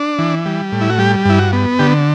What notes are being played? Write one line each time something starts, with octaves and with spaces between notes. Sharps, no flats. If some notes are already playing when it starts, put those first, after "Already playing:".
Already playing: D4
E3
G3
A2
E4
F#4
G3 G4
G2 E4
F#4
B3
D3 G4